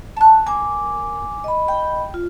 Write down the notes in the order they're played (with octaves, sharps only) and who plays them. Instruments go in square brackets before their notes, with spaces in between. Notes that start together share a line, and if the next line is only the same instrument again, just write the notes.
[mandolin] A5 F#6
[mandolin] A#3 [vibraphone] G#5 D6
[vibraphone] D#5 B5
[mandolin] G5
[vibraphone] F4